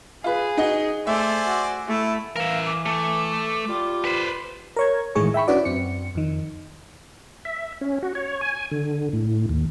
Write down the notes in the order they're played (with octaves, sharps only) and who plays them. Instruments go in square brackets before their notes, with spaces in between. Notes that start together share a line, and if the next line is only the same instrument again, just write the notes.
[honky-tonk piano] F4 B4 [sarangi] G#4
[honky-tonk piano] D#4 F#4 D#5
[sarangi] A3 [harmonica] C5 D5 G#5 [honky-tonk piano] E5
[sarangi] F#4
[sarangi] A3 [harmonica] E4
[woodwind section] E3 [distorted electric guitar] A#4 E5 [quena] F5
[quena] D6
[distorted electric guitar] A3
[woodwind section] G3 F4
[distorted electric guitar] B4 C5
[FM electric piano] A#4 C#5 G#6
A2 D#3 E3 G#3 G#4 C#6
E5 G5 B5 C#6
C#4 D4 E4 F#4 B4 D5
F#2 C4 C#7
F2 D#3
[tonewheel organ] E5
C#4
F#4
C#5
G#5
D3
A2
D#2